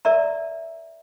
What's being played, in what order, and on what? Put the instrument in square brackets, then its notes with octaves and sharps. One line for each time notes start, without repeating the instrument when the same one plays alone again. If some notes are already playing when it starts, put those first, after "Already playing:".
[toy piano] A#4 D5 E5 A#5